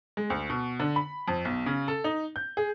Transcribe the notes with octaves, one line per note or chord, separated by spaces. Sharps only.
G#3
D2
B2
D3
B5
F2
B1
C#3
A4
D#4
G6
G#4